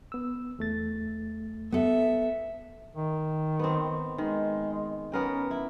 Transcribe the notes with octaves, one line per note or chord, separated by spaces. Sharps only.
B3 E6
E2 A3 A6
B3 A4 E5
D#3
B3 C4
D#3 G#3
B3 C#4 A#4 G5
E4